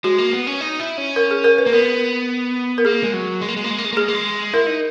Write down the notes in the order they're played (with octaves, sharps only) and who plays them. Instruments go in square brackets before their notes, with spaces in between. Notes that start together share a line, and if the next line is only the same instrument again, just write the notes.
[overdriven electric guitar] G#3 [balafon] F#4
[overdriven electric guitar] A#3
B3
C#4
D#4
E4
C#4
[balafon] A#4
G#4
A#4
B4
[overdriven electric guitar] A#3
[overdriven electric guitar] B3 [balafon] A#4
[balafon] A#4
[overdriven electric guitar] A#3 [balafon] G#4
[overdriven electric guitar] G#3
F#3
G#3
A#3
G#3
A#3
G#3
A#3
G#3
A#3
[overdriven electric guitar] G#3 [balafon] G#4
[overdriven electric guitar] A#3
G#3
[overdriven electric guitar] E4 [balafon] A#4
[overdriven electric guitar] D#4